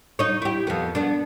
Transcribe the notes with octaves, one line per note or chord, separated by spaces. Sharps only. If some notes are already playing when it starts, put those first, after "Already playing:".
D#4 C#5
E4 G4
F2 B3
B3 D4